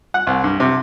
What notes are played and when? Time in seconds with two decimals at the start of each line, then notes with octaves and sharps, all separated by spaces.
0.14 F#5
0.27 C2
0.44 G2
0.60 C3